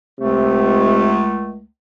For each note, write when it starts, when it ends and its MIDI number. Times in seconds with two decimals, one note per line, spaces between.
0.20 1.66 37
0.20 1.25 48
0.20 1.66 57